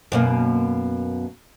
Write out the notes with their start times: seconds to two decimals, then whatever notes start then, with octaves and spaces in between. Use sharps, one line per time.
0.12 F#2 B2 A#3